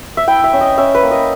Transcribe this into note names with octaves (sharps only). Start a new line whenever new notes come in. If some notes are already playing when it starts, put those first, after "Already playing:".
E5
E4 G5
E5
C#4
D#5
C#4 E5
B4
A#3
D#5